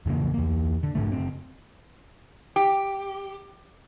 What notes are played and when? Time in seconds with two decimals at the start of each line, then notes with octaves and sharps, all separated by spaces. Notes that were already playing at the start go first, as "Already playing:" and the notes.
0.06 F2 C#3 E3 A#3
0.34 E2 A#3
0.83 D3
0.95 G#2 D3 A3
1.12 F#1 C4
2.56 G4